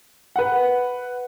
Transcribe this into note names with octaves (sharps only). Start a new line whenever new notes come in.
B4 F#5